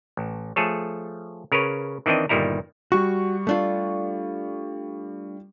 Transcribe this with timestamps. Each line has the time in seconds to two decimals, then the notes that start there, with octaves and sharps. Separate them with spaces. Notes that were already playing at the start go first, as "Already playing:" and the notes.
0.17 A1
0.56 F3 A3 G#4 A4 C#5
1.52 C#3 A#4 B4 C#5
2.06 D#3 E3 C4 D4 D#5
2.29 G1 A#2 D#3 G3 E4 A#5
2.92 G3 F#4 C#6
3.47 A3 D4 F4